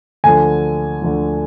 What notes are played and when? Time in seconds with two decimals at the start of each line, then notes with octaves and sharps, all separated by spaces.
0.24 D2 D3 F3 G#5
1.02 D2 D3 F3